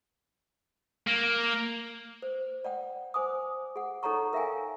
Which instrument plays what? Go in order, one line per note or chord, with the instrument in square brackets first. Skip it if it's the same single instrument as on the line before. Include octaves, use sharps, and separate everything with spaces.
[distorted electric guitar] A#3
[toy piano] C5
D5 F#5 G5
C5 G#5 D6 D#6
G#4 F#5
D#4 A4 C#5 F#5 A#5 C#6
A#4 E5 F5 G5 G#5